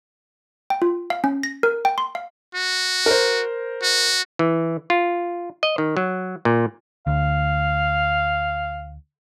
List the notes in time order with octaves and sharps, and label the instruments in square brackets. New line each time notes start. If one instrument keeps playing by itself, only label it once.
[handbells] G5
F4
F5
C#4
A#6
A#4
G5
C6
F5
[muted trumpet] F#4
[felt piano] A#4 C5
[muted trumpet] F#4
[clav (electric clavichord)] E3
F4
D#5
D#3
F#3
A#2
[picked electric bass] D2 [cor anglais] F5